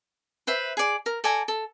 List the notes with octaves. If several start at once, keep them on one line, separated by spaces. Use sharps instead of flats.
B4 C5 E5
G#4 D5
A#4
A4 D5 G#5 A#5
A4